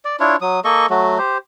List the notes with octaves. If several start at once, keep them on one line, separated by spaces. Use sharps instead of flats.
D5
D4 E4 F4 C#5
F#3 D#6
A#3 A4 D#5 C#6
F#3 A3 F#4
G4 C5